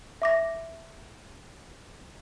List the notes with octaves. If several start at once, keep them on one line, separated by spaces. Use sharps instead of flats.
E5 D6 A#6